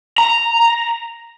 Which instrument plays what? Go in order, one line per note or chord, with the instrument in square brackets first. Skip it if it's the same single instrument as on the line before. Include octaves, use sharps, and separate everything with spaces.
[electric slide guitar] A#5